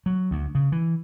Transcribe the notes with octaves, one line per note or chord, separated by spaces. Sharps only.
F#3
D2
C#3
E3